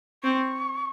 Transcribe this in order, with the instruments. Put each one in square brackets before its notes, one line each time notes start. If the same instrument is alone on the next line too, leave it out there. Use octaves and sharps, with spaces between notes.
[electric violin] C4 [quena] C#6